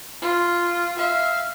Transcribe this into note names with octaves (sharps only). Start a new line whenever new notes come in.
F4
E5 F5